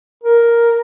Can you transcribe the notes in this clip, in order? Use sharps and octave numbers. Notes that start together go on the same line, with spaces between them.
A#4